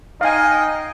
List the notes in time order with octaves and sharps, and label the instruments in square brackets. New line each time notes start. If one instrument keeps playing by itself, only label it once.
[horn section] D#4 D#5 G5 [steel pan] F5 G#5